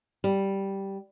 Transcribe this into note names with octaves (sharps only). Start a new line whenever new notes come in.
G3